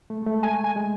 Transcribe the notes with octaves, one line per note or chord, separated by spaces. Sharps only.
A3
G#3
A3
A3 G#5
G#5
G#3